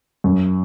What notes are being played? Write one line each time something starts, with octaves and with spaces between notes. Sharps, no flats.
F#2